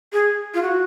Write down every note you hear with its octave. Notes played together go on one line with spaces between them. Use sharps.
G#4
F4
F#4